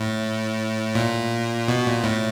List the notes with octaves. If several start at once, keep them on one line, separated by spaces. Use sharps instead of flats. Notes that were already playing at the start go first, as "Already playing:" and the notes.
Already playing: A2
A#2
B2
A#2
A2